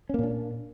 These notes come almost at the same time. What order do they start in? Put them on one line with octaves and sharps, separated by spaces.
C#4 A#3 A#2 D4